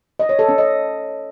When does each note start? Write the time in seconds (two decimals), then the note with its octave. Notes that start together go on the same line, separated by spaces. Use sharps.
0.19 D#5
0.29 C#5
0.39 A4
0.49 C#4
0.58 D#5